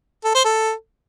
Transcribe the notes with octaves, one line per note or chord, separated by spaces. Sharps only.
A4
C5
A4